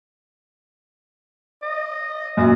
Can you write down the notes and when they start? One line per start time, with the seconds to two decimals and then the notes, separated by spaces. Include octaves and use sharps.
1.62 D#5
2.37 F#2 A#2 D#5